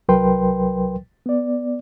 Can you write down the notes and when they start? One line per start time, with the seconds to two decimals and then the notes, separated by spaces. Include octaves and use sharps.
0.09 C2 F#3 A#4 B4 G5 C6
1.26 B3 D5